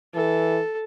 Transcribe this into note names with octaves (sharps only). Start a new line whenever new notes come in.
E3 A4